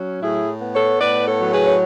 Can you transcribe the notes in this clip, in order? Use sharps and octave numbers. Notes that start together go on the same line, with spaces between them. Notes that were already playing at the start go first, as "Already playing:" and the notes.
Already playing: F#3 C#4
A2 E4 G#4
B3
A4 C#5
A2 B4 D5
A4 C#5
F#3
G#4 B4
C#5